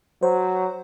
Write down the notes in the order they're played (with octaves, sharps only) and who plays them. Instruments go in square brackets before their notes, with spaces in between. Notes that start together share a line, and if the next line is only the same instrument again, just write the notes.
[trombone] F#3 [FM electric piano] C5